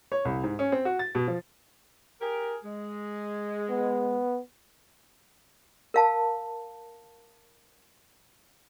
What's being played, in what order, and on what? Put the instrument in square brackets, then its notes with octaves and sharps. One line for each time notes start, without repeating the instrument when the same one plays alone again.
[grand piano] C#5
C2
G#2
C#4
C4
F#4
A6
B2
F3
[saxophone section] G4 G#4 A#4
G#3
[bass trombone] B3
[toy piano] A#4 F5 A5